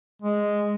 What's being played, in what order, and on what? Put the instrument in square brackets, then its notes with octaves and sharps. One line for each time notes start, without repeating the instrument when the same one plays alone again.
[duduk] G#3